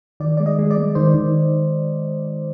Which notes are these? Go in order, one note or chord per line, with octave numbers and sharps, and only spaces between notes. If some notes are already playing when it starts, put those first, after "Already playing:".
D#3 D5
G#3 D5
D#5
G#3
D5
G#3
D#3 C5
D#3